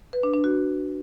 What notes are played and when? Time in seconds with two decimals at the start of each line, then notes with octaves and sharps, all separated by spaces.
0.13 B4
0.23 D4
0.34 D4
0.44 F#4